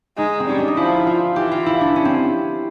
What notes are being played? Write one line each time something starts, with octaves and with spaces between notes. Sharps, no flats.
G#3 D#4
C4
G3 C#4
D4
D#4
F3 E4
F4
E3 G4
F4
E4
D4
C#4
C4